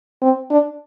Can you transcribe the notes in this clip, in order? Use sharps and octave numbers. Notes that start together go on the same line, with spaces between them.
C4
D4